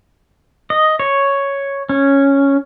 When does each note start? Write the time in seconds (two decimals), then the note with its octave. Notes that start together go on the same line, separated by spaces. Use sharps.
0.70 D#5
1.00 C#5
1.89 C#4